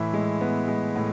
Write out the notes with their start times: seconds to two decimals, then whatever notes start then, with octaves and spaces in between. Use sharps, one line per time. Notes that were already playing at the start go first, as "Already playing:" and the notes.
Already playing: A2 E3 E5
0.13 G#3
0.41 B3
0.68 G#3
0.96 A2